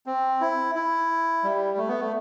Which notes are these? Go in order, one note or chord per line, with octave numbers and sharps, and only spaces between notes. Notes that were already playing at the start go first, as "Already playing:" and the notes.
C4
E4
E4
G3
A3
B3
A3